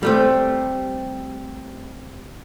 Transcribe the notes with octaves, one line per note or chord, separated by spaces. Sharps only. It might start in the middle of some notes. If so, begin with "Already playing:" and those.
G3 A3 C4